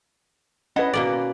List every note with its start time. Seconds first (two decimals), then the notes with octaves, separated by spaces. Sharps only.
0.76 C#4 E4 B4 D#5 F#5
0.93 B2 A#3 D5